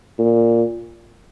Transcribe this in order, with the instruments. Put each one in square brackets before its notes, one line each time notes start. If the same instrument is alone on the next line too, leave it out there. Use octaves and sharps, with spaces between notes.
[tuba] A#2